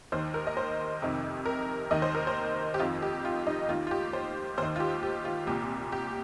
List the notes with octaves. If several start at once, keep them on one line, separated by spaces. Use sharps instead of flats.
D#2 D#3 C5
A#4
D#5
C5
F2 C3 D#3
A#4
D#2 D#3 D#5
C5
A#4
C5
G4
F2 D#3 F4
G4
F4
D#4
D#2 D#3 F4
F4
G4
C5
D#2 D#3 C5
F4
G4
G4
F4
C2 A#2 G4
G4